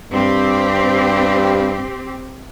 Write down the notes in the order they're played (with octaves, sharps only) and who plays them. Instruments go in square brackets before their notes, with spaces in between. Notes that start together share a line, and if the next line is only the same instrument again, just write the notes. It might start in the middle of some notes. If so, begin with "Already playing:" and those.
[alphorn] G2 [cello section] C4 G4